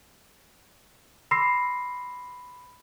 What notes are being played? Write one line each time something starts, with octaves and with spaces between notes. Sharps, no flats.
B5 C6 D6 E6 A#6 C7